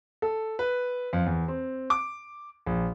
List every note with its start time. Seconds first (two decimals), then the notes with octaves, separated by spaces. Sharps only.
0.22 A4
0.59 B4
1.13 F2
1.26 E2
1.48 C4
1.90 D6
2.67 A#1